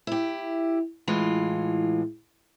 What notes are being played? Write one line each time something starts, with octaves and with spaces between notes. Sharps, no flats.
E4 G4
A2 E3 G#3 F4